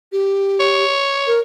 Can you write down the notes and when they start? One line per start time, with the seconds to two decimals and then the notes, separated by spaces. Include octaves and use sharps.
0.12 G4
0.60 C#5
1.27 A#4